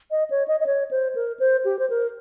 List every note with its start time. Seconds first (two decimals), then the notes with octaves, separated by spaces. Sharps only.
0.11 D#5
0.30 C#5
0.48 D#5
0.60 D#5
0.66 C#5
0.91 C5
1.15 A#4
1.39 C5
1.65 G4
1.79 C5
1.90 A#4